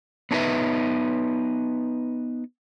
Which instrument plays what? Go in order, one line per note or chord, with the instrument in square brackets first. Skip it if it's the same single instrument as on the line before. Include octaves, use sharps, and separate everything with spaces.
[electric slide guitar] B3 D4 D#4 F4 B4 E5